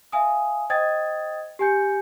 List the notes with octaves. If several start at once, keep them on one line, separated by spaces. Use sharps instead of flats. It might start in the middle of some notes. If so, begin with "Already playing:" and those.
E5 F5 G#5 D#6
C5 D#5 G5 D#6 G#6 A6
G4 G#5 G6 C#7